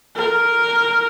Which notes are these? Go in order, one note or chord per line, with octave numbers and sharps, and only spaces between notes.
A#4